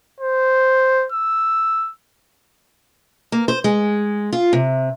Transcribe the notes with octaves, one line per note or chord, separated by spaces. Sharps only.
C5
E6
A#3
C5
G#3
F4
C3